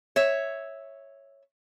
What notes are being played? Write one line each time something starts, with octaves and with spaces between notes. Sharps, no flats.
C#5 E5